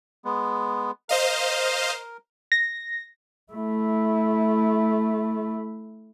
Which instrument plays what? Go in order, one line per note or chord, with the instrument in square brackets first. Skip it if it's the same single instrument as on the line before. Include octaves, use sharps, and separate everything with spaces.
[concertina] G#3 B3
[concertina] A#4 [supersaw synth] C5 D#5 F5
[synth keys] A#6
[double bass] A3 E4